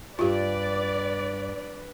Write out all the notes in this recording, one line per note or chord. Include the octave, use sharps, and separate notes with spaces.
D2 G2 F4 G4 B4 D5